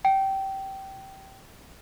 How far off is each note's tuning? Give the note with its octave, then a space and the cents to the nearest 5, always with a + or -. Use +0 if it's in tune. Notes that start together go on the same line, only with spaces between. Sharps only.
G5 -20